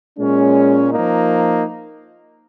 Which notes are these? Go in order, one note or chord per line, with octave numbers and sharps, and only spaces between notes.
A#2 G#3 C#4
F3 A#3 D#4